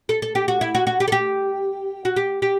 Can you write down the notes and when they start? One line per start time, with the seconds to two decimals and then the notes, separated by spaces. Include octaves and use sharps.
0.09 A4
0.22 A4
0.35 G4
0.48 F#4
0.61 E4
0.75 F#4
0.87 F#4
1.00 G4
1.08 A4
1.12 G4
2.05 F#4
2.16 G4
2.42 G4